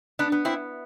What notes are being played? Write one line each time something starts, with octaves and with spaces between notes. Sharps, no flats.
B3 D4
B3
C4 E4